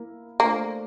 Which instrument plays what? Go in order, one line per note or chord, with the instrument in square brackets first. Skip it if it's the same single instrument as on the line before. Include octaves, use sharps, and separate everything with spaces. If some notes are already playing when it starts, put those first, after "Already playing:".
Already playing: [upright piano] A#3 E4 A#4
[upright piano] A3 D4 F4 C5 [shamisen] A#3